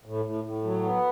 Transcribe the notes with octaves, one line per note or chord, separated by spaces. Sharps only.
A2
A2
A2
F#3
B3